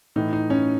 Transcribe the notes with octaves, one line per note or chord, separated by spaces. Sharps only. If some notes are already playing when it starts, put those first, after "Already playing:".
A2 E3 D#4
D#4
C#4